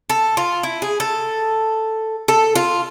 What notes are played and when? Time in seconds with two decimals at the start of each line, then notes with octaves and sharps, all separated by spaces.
0.09 A4
0.37 F4
0.63 E4
0.82 G#4
1.00 A4
2.28 A4
2.55 F4